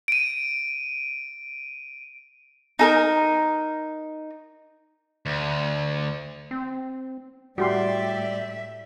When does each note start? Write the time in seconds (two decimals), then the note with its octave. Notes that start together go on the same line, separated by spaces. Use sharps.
0.08 D7 D#7
2.79 D#4 A4 A#4
5.26 D2
6.51 C4
7.58 A2 G3 F#4 G4 D5 E5 G5 C6